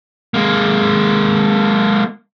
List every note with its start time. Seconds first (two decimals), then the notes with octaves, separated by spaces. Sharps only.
0.34 G#3 A#3